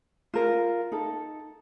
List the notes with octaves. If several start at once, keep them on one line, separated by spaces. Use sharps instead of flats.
F4 A#4
D#4 A4